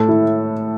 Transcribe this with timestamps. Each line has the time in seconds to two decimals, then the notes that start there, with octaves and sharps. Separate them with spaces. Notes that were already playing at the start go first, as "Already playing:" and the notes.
Already playing: A2 A4
0.08 E4